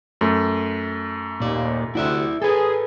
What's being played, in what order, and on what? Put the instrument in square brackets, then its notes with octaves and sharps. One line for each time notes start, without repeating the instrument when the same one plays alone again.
[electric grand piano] F#2 A3
[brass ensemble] D#2 [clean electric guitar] A#2 D5
[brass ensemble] D2 C3 F#5 [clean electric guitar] E4 D5 E5
[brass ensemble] G#4 [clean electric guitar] A4 B4